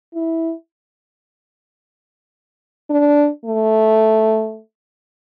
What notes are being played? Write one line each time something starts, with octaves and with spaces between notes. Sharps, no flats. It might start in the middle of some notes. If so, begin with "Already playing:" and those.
E4
D4
A3